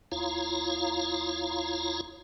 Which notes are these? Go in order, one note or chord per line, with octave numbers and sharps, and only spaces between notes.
D#2 E4 F4 C#5 F5 A#5